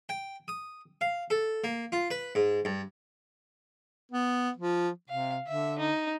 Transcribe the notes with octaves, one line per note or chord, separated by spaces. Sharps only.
G5
D#6
F5
A4
A#3
F4
B4
G#2
G2
B3
F3
C3 F5
D3 E5
D#4